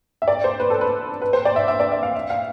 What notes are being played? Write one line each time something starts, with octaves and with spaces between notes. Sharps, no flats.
E5
D5
C5
B4
A4
B4
B4
C5
D5
E5
E5
D5
E5
F5
E5
F5